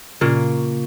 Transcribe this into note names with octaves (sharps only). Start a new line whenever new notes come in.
A#2 C#3 A#3